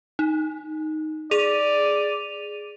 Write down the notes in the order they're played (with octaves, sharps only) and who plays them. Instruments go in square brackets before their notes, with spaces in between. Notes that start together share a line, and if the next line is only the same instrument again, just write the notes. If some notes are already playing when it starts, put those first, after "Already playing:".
[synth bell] D#4
[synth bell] G#4 D#7 F7 [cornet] D5